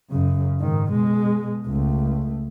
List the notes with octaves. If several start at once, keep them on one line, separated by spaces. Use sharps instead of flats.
F#2 C#3
G#2 D#3
B2 G#3
C#2 A3